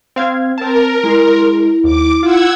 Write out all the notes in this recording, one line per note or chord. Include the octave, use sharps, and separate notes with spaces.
C4 F5 G#6
C4 A#4 A5
G#3 E4 C6
D#2 D6
F4 F#5 E6 G#6